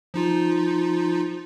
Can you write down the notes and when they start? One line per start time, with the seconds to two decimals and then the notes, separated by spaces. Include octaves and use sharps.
0.14 F3 D#4 F4